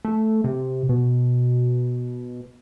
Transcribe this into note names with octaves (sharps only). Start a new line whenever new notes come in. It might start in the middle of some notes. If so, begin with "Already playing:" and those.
A3
C3
B2